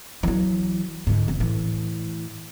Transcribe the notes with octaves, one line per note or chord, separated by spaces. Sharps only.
E3 F#3
G#2 D3
F1 D#3
A2 E3